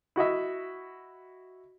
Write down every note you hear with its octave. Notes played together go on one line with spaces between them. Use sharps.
E4 F#4 D#5 E5